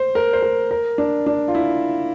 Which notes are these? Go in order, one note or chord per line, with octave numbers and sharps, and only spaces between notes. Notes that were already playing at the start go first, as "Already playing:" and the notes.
Already playing: C5
A#4
C5
A#4
A#4
D4
D4
F4
E4